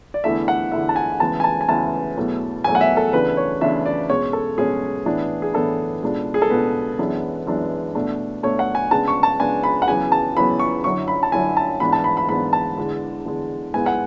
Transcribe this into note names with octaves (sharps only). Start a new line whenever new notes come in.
D5
E2 D3 A3 E4 E5
F#5
E2 D3 A3 E4 E5
A5
G#5
D2 C#3 E3 G#3 B3 A5
G#5
A5
G#5
D2 C#3 E3 G#3 B3 A5
E2 B2 F#3 A3
E2 B2 F#3 A3 G#5
F#5
E5
A4
D2 C#3 E3 B3 D4 B4
C#5
D2 C#3 E3 B3 D4 E5
D5
B2 G#3 C#4 C#5
A4
B2 G#3 C#4 G#4
A2 E3 B3 D4
G#4
A2 E3 B3 D4 A4
C#2 B2 G#3 D4
G#4
A4
C#2 B2 G#3 D4 B4
F#2 E3 G#3 B3 D4
F#2 E3 G#3 B3 D4
B2 A3 D4
B2 A3 D4 C#5
F#5
G#5
C#3 G#3 B3 D4 A5
C#6
A5
C#3 G#3 B3 D4 G#5
B5
F#5
E2 C#3 F#3 B3 G#5
A5
E2 C#3 F#3 B3 B5
C#6
F#2 D3 F#3 C#4 E4 C#6
B5
A5
F#2 D3 F#3 C#4 E4 G#5
A5
G#2 E3 B3 D4 B5
A5
B5
B5
G#2 E3 B3 D4 B5
A5
E2 D3 G#3
E2 D3 G#3
G#2 G#3 B3 E4 G#5
F#5